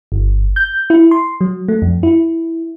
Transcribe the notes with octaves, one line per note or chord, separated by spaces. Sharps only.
G1
G6
E4
C6
F#3
A3
F2
E4